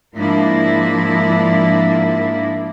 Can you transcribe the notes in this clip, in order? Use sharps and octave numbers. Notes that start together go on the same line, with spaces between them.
G#2 F3 A#3 D4 E4